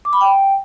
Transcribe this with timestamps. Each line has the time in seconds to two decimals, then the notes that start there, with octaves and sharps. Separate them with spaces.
0.05 D6
0.13 B5
0.21 G5